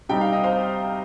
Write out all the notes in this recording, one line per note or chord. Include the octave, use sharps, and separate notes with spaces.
C3 G3 C4 D#4 G5
F5
D#5
C5 F5